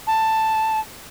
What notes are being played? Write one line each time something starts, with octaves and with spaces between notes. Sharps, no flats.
A5